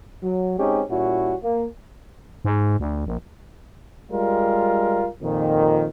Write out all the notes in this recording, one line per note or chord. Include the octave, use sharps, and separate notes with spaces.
F#3
G#3 C4 C#4 D#4 G4
A#2 G3 C#4 E4 F#4
A#3
G#2
D2
A#1
G3 G#3 F4 A#4
F2 A#2 D#3